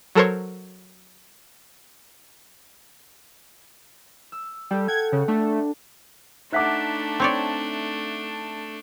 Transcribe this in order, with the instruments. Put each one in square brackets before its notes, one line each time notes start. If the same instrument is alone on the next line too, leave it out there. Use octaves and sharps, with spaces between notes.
[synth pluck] F#3 A4 A#4 C5 C#5
[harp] E6
[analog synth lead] G3 [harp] A4 G5
[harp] F#5 G5 [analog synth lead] G#6
[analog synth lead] C#3
[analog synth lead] A3 [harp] D4
[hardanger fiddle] A3 D4 [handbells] D#4 F#6 B6 [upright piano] E5 F#5 D6
[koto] C4 C#5 D5